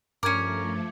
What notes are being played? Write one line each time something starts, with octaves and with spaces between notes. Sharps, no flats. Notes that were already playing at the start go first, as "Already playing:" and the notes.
G2 F3 A3 C#4 A#4 D6 G#6 C#7